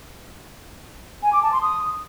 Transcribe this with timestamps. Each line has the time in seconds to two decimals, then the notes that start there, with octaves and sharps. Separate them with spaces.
1.23 G#5
1.33 D6
1.43 A5
1.52 C6
1.62 D#6